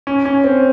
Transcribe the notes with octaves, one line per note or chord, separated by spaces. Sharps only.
C#4
C#4
C4